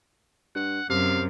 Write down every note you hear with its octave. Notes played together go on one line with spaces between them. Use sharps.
G2 F#5
F#2 C3 F5